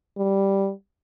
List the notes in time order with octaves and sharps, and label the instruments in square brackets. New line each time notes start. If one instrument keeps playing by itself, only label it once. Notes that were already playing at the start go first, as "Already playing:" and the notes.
[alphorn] G3